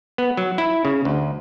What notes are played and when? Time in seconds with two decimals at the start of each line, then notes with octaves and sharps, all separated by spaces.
0.18 B3
0.37 F#3
0.58 E4
0.85 C#3
1.05 D2